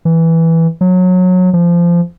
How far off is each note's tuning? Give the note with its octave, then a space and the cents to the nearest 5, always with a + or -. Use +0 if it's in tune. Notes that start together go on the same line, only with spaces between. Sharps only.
E3 -5
F#3 -20
F3 -20